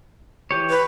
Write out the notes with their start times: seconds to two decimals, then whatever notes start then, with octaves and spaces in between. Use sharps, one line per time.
0.51 E3 G4 C#5
0.70 B4